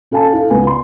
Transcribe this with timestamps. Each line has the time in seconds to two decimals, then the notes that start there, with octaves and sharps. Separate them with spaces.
0.11 C#4 A4 F5 G#5 A5
0.32 E4 A4 F5
0.50 C#2 B3 B4 G#5
0.67 C6